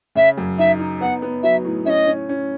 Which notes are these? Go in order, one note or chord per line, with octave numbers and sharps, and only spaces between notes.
C#3 E5
F#2
D#4 E5
D#4
B3 F#5
B3
F#3 E5
A2
C#4 D#5 E5
C#4
C#4